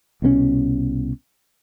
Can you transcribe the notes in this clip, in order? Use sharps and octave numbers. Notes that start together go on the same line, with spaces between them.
C2 B2 G#3 C#4